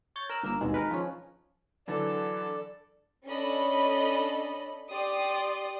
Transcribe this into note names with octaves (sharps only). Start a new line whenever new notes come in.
C#5 G6 A6
A#4 E6 F#6
G1 A#3 A#4 E6
G#1 D#2 B2 G#3
D#3 G#3 A#4 B4
F3 C#4
D3 E3 F#3 A4 D5
C#4 D4 A4 D#5 B5
G4 D5 C6 D#6